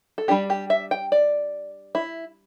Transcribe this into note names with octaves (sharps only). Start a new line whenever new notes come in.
A4
G3 D4 G4
G4
E5
G5
D5
E4